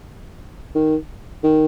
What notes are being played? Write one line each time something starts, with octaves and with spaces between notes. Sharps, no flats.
D#3
D#3